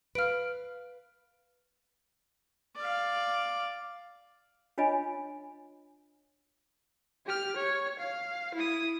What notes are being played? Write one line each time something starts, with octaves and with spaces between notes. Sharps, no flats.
B4 F5 F6 D7
D5 F5
D4 F4 C#5 D#5 G#5 B5
G4 F6
C#5
F5
E4 D#6